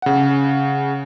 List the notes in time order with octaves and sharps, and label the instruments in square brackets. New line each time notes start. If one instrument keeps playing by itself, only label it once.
[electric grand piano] C#3 F#5